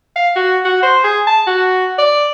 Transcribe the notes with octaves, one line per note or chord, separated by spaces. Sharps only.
F5
F#4
F#4
C5
G#4
A5
F#4
D5